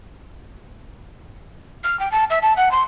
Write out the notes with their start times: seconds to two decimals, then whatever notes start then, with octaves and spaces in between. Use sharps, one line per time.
1.84 F6
2.00 G5
2.12 A5
2.30 E5
2.42 A5
2.57 F#5
2.72 C6